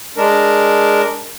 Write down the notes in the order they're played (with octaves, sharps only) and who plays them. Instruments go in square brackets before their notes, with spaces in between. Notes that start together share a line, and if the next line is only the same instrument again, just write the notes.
[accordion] G#3 D4 A#4